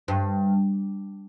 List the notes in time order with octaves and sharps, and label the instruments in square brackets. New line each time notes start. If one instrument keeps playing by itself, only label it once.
[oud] G2